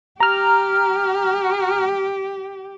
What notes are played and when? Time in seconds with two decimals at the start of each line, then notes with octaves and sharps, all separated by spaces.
0.20 G4 A#5 F6